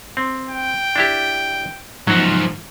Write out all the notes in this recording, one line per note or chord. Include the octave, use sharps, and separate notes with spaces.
C4
G5
D4 E4 G4
G#2 F3 F#3 F#4